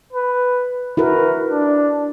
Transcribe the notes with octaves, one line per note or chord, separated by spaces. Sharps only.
B4
E4 F#4 A#4 B4
D4